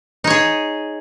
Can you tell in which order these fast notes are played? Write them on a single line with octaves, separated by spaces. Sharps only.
D#4 C#5 G#4